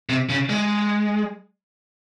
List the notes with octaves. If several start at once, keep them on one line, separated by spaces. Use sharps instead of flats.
C3
C#3
G#3